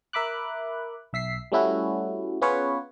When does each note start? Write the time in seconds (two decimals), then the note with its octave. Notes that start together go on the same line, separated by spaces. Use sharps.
0.13 A#4 E5 B5 D6 F#6
1.13 B1 E5 B6 C7
1.52 G3 A3 C#4 E4 F#4
2.42 B3 C#4 F4 G#4 B4 C#5